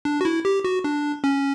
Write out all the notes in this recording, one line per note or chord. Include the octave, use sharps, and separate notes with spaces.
D4
F#4
E4
G4
F#4
D4
C#4